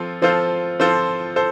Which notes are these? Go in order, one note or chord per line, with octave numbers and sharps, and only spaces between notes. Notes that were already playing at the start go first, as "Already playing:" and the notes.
Already playing: F3 C4 F4 A4
F3 C4 F4 A4 C5
F3 C4 F4 A4 C5
A4 C5